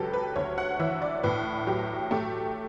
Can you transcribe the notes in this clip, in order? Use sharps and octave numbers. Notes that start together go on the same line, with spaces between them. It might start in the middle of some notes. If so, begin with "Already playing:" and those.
Already playing: C#2 F#3 G4 A4 B4
B4
D2 C#5
F#5
E3 E5
D5
A2 B4
F#3 G4
A3 G4